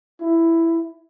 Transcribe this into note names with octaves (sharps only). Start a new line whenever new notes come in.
E4